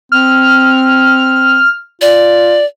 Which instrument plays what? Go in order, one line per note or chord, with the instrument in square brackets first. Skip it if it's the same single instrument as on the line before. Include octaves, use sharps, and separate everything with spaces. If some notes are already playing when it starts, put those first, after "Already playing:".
[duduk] C4 [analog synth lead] F6
[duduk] F4 [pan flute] D5